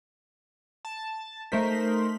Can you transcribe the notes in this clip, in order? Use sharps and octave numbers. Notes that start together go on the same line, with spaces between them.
A5
A3 D#4 A#4 C5 B6